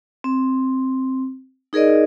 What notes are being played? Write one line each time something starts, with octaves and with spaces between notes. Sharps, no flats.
C4
D#4 G#4 A#4 D5 D#5